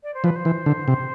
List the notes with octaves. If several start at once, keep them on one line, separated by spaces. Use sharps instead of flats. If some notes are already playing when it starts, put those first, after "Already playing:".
D5
C5
F3 B4
C5
E3
D3
C3